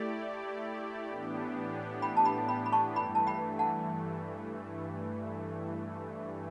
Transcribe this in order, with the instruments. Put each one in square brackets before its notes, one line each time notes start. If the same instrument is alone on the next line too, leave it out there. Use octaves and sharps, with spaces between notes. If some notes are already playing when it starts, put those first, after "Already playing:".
Already playing: [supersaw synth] A3 E4 G4 D5
A2 E3 B3 D4 G4
[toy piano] G5 B5
A5
G5 B5
G5 B5
B5
A5 C#6
[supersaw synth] G2 E3 A3 [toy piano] G5 B5
[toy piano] A5
G5 B5
F#5 A5